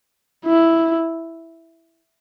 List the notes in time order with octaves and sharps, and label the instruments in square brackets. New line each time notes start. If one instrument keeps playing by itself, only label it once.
[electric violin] E4